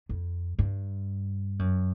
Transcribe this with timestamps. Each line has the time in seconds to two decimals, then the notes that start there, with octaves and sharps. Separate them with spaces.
0.09 F2
0.59 G2
1.59 F#2